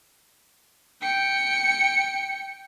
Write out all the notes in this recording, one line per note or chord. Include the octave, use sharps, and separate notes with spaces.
G5 C#7